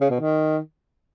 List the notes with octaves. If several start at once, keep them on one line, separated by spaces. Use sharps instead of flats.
C#3
B2
D#3